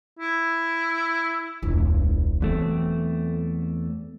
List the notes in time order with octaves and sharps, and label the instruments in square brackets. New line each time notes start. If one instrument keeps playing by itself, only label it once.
[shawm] E4
[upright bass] E1 C#2
[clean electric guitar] E2 A3 C4 [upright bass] F#3